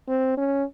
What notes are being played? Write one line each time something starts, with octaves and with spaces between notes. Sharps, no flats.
C4
C#4